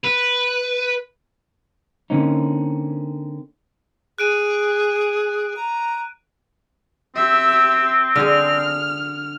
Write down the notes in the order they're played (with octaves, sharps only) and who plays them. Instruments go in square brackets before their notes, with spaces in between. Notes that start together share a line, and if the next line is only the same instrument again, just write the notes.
[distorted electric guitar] B4
[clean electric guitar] D3 A#3 C4 C#4 D#4
[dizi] G#4 [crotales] F#6 D7 D#7
[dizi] A#5
[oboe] C4 [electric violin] G4 E5
[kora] D3 G#4 [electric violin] F6